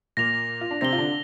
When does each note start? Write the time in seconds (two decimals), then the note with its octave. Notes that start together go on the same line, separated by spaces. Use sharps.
0.17 A#2 A#3 A#6 F7
0.61 F4
0.71 D4
0.81 C3 C4 A#6 G7
0.93 F4
0.98 D3 D4